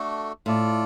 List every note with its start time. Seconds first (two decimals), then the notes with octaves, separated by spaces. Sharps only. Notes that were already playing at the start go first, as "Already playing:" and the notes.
Already playing: A3 D4 F#4 A4
0.46 A2 F4 A4 D5